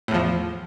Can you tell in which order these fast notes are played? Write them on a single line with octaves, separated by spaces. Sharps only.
A2 E2 F3